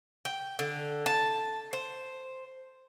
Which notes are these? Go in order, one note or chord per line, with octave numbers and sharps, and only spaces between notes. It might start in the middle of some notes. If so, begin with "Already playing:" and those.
G5
D3
A5
C5